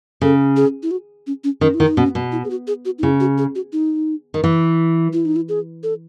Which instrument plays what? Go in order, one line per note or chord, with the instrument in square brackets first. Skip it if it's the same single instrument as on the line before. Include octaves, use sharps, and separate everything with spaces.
[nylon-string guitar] C#3 [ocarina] A4
[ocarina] G#4
E4
F#4
C#4
C#4
[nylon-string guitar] D#3 [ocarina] C#4
[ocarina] E4
[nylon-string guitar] D#3
[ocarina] D#4
[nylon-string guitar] B2 [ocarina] C#4
[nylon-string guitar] B2
[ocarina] E4
G#4
F#4
G#4
F#4
D#4
[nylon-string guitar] C#3 [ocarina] E4
[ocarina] F#4
G#4
F#4
D#4
[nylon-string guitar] D#3
E3
[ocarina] E4
D#4
E4
G#4
A4